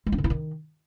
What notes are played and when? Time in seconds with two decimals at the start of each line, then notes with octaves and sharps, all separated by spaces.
0.06 G#3
0.12 D4
0.18 D3
0.24 E4
0.30 D#3